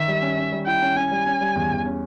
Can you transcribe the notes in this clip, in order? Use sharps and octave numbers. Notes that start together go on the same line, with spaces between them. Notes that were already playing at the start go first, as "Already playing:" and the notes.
Already playing: D#3 E5
G3
C#4
C#4
G3
E4 G5
C#4
C#4 G#5
G3
C#4
G3
E2
E2
C#4